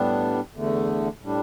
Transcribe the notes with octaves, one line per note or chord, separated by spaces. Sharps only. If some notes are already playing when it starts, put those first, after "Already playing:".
Already playing: A2 G3 B3 D4
E2 D3 A3
A2 G3 D4